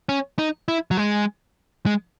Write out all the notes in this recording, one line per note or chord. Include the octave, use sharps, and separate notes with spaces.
C#4
D#4
E4
F#3
G#3
G#3